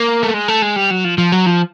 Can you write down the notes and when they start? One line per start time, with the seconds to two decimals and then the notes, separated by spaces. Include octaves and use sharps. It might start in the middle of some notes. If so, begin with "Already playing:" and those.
Already playing: A#3
0.23 A3
0.34 G#3
0.48 A3
0.62 G#3
0.76 G3
0.91 F#3
1.05 F3
1.18 F3
1.32 F#3
1.46 F3